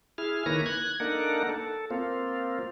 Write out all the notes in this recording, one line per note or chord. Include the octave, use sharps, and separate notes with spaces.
E4 G#4 F6
D#3 A#3 E4 B4 C#5 A#6
F#6 G#6
A#3 D4 D#4 A4 A#4 F#5
A4
A#3 C4 F4